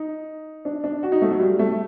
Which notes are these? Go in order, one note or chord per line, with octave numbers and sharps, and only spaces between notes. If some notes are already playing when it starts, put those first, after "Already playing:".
Already playing: D#4
D4
D4
F#4
D#4
A3
F#3
G3
A3